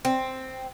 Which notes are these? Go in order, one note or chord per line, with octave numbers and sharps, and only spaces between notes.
C4